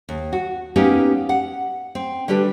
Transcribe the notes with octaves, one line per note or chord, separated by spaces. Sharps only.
D#2
F#4
A#3 B3 C#4 D#4 G4 A#4
F#5
C4
D3 G3 D4 G4 B4